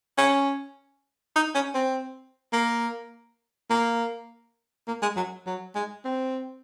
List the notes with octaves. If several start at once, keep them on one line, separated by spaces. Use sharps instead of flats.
C#4
D#4
C#4
C4
A#3
A#3
A#3
G#3
F#3
F#3
G#3
C4